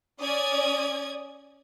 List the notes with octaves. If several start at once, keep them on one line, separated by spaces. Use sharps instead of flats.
C#4 D5 D#6 G#6